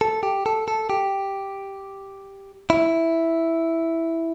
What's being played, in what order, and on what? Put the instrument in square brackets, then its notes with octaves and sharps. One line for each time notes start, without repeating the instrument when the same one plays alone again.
[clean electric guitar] A4
G4
A4
A4
G4
E4